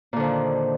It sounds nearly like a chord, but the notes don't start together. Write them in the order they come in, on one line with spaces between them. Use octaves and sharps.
A#2 D3 F3 D#3